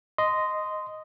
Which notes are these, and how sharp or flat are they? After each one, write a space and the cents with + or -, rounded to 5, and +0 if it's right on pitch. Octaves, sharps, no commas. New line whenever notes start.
D#5 +0 C6 -15